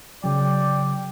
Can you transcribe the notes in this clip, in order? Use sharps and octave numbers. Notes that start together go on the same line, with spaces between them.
C#3 F#3 D5 G5 D6